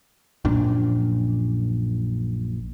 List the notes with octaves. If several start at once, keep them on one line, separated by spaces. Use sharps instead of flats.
A#1 F#2 A#2 D4